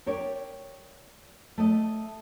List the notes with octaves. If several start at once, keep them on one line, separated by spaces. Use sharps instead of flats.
G4 A#4 C#5 D5
A3 D#5